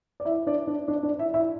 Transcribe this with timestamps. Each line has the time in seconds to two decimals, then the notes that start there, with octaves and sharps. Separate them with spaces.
0.20 D5
0.25 E4 E5
0.46 D4 D5
0.67 D4 D5
0.88 D4 D5
1.03 D4 D5
1.19 E4 E5
1.34 E4 E5